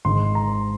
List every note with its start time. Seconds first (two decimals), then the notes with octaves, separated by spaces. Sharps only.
0.05 G#1 G#2 D#3 G#3 C6
0.35 A#5